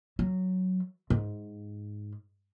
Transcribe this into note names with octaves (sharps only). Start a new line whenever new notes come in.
F#3
G#2